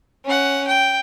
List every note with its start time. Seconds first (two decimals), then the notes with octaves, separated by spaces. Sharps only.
0.25 C#4 F#5
0.67 G5